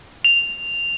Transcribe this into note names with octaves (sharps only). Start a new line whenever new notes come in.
F7